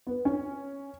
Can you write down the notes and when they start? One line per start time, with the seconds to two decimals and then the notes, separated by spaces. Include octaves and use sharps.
0.07 B3
0.25 C#4